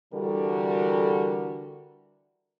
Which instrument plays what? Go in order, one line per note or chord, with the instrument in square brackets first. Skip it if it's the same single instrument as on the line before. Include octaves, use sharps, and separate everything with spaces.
[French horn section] D3 E3 G3 F#4 A4 A#4